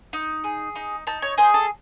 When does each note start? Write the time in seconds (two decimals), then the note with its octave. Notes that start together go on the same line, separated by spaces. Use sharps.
0.13 D#4
0.44 G#4
0.75 D#4
1.07 D#4 A5
1.22 C#5
1.38 G#4 C5
1.54 A4